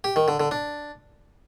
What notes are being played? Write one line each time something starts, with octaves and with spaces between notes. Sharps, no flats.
G4
D#3
D3
D3
D4